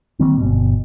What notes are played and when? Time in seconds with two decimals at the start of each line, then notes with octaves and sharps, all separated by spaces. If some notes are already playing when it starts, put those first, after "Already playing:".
0.19 D#3 G3 A#3 C4
0.38 G1 B2